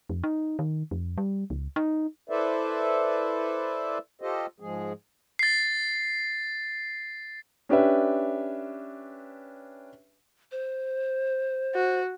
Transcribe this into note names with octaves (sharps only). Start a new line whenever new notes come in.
F2
D#4
D#3
F2
G3
C#2
D#4
E4 A4 B4 C5 D5 E5
F4 G4 A4 C5 D#5
G#2 F3 G#3 G#4
A6 C7
C#4 D4 G4 B4 E5
C5
F#4